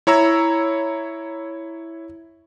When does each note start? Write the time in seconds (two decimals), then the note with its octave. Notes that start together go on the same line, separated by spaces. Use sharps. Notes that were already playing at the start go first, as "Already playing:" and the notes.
0.07 E4 C#5 A#5 E6